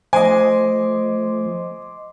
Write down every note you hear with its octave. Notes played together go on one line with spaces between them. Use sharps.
F3 A3 C5 D#5 G#5 C6 D6